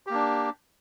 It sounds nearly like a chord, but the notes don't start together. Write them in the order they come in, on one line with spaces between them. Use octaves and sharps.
G4 A#3 D4